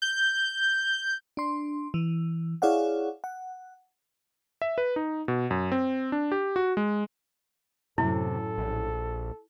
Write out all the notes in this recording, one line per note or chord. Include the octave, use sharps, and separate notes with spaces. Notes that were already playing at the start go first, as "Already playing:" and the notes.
G6
D4 C6
E3
E4 G#4 C#5 D5 F5 F#5
F#5
E5
B4
D#4
B2
F#2
C4
D4
G4
F#4
G#3
F#2 A2 C3 E4 A4
A#1